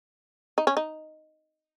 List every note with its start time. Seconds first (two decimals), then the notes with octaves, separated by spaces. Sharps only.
0.58 D#4
0.67 C#4
0.77 D#4